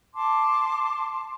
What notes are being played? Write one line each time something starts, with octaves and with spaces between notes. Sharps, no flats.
A5 C6 D6